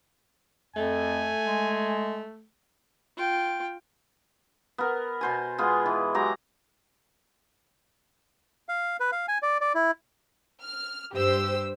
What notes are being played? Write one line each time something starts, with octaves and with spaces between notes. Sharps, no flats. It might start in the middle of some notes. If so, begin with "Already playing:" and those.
F2 A3 G#5
G#3
F4 G5
B3 A#4
B2 C5 G#5
G#3 B3 F4 G#4
E3
F#3 G#3 G4 A#5
F5
B4
F5
G#5
D5
D5
E4
F6
G2 G4 C5 E6